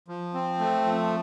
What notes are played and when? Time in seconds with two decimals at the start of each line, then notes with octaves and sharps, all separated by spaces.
0.08 F3
0.34 C4
0.59 A3
0.85 F3